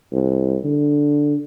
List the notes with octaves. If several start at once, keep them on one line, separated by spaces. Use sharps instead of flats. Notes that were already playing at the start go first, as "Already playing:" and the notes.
C2
D3